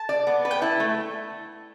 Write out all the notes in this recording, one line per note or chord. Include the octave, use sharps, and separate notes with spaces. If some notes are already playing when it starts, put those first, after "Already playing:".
Already playing: A5
D5
B3
B4
G5
E4 A5
A3